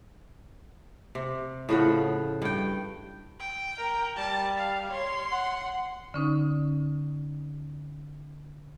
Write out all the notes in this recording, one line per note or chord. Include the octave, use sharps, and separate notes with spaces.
C3
A2 C#3 F3 F#5
G2 G5
G5
A#4
G3 A5
F5
C#5 C6
F#5
D3 C#4 D#4